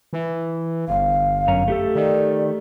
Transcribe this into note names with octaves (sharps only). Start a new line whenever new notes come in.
E3
G1 F5
F#2 C#4 A#5
A3 G4 A4
D#3 D5